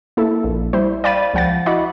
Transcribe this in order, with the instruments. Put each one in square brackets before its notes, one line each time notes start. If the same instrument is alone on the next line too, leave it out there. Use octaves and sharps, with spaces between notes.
[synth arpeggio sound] A#3 E4 A4
A#1
G3 E4 C5
D5 F5 G5 B5 A6 D#7
C#2 F3 F#5 G5 A6
E4 F#4 D#5 F#5 B5 D6